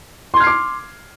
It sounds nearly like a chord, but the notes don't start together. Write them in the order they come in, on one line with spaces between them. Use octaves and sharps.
C6 G#6 F6 C7 D6